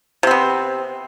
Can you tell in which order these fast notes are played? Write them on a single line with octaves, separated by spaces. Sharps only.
C3 C4 B3